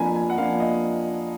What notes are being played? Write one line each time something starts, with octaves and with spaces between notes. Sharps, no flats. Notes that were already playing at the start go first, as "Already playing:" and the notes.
Already playing: F2 F3 A#3 D4 G#5 A#5 B5
G#5
F#5
F3 A#3 D4 F5
D#5